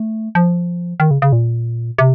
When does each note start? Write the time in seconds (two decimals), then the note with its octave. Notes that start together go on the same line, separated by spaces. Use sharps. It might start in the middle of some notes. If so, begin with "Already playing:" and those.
Already playing: A3
0.35 F3
1.00 D#3
1.11 C#3
1.22 C#3
1.32 A#2
1.98 C3